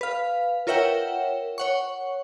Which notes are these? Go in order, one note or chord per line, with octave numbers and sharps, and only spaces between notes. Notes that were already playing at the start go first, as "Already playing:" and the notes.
B4 F5
F4 A#4 C#5 E5 F#5 G5
C#5 F#5 C#6